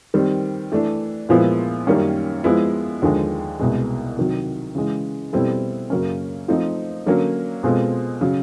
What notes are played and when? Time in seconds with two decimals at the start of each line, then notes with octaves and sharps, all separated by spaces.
0.14 D#3 G3 C4
0.72 E3 A3 D4
1.29 A#2 F3 G#3 B3 E4
1.87 F#2 D#3 G3 A#3 C#4
2.44 F3 G#3 B3 E4
3.02 D#2 D3 F3 G#3
3.59 C2 B2 G#3
4.17 C3 D#3 F#3
4.75 C#3 E3 G#3
5.33 B2 G3 C4 E4 A4
5.90 F#2 C#3 F#3 A#3 C#4
6.48 F3 A3 C4 D#4
7.06 D3 F#3 A#3 C#4
7.63 B2 G#3 C4 F4 A4
8.21 C#3 F#3